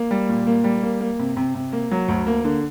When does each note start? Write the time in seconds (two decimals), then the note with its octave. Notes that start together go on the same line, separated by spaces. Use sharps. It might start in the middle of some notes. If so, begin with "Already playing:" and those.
Already playing: A#3
0.11 G3
0.29 A#2
0.47 A#3
0.64 G3
0.83 A#3
1.00 A#3
1.19 C3
1.37 C3
1.55 C3
1.72 A#3
1.91 F#3
2.08 D2
2.27 A#3
2.44 D3